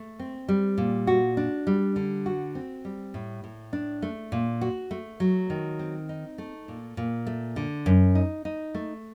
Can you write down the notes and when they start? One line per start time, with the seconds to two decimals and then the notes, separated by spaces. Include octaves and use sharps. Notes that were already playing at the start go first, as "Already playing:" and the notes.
Already playing: A3
0.19 C4
0.49 G3
0.78 A#2
1.07 F#4
1.37 D4
1.67 G3
1.96 D3
2.26 F#4
2.55 C4
2.85 G3
3.14 A2
3.44 A2
3.73 D4
4.02 A3
4.32 A#2
4.61 F#4
4.91 A3
5.20 F#3
5.50 D#3
5.79 C4
6.09 D#4
6.38 A3
6.68 A#2
6.97 A#2
7.27 A3
7.56 D3
7.86 F#2
8.15 D#4
8.45 D#4
8.74 A3